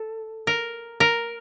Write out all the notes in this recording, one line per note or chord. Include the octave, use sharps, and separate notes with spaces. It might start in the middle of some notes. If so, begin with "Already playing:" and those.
Already playing: A4
A#4
A#4